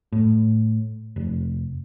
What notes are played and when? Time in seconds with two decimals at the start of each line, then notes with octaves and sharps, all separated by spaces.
0.12 A2
1.16 F1